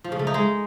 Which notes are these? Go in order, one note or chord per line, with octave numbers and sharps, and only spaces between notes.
F3
C#3
A3
D#4
G#3